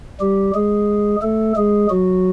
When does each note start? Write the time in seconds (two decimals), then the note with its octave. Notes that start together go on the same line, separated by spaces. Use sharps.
0.20 G3 G4
0.55 G#3 G#4
1.22 A3 A4
1.56 G#3 G#4
1.90 F#3 F#4